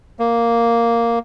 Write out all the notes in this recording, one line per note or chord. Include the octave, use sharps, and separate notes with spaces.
A#3